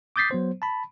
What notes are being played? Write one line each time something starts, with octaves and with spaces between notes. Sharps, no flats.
D6 D#6 G6 A6 B6 C7
F#3 B3 C5
A5 B5